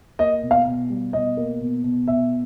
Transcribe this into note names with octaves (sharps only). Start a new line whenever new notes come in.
A#3 D#5
B2
F5
B2
G3
B2 D#5
A#3
B2
B2
B2 E5